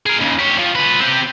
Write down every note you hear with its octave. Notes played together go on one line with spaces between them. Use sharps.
G#4 A#4
D#2 C#3
G4 C#5
F3
F4 B4
C4 G4